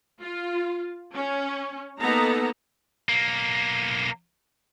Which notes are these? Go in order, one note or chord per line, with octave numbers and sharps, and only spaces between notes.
F4
C#4
A#3 B3 D#4 A4 A#5
B1 A#3